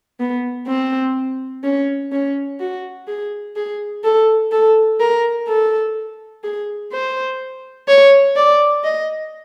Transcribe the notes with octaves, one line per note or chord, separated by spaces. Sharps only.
B3
C4
C#4
C#4
F#4
G#4
G#4
A4
A4
A#4
A4
G#4
C5
C#5
D5
D#5